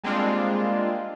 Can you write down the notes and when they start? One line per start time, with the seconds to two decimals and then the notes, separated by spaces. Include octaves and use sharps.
0.04 G3 G#3 A#3 C4 D4 F4